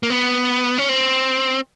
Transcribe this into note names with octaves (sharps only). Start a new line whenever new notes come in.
A#3
B3
C#4
C4